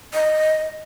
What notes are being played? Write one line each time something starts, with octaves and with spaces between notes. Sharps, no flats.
D#5